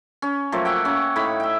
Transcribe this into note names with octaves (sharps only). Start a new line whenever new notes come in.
C#4
F3 F#3 A3 A#3
E5 F#5 G5
A#3 C#4
A2 D#4 C#5 B5
E5 G5